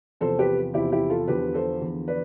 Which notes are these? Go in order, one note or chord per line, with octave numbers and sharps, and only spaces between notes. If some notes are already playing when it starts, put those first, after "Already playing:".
E2 C3 F3 A4 C5
G4 B4
E2 C3 F3 E4 G4
E4 G4
F4 A4
E2 D3 F3 G4 B4
A4 C5
E2 D3 F3
B4 D5